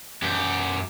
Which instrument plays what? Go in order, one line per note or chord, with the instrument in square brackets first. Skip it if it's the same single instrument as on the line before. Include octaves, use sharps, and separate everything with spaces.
[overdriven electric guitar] F#2 G4